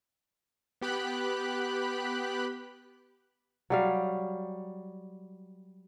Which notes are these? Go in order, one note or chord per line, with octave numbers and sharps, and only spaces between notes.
B3 G4 B5 F#6
F#3 G3 F5